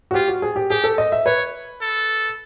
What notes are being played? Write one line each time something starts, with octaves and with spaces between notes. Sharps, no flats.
F#4
F4 G4
F#4
G#4
G4
G4 G#4
A4
D#5
E5
B4 C#5
A4